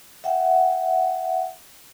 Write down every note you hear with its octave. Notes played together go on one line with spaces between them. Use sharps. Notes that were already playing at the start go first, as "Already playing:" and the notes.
E5 F#5 G5